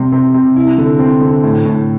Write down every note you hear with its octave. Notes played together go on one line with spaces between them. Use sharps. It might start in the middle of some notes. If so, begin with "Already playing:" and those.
Already playing: C3 G3
C3
C3
E4
D3
C4
D3
A2
A2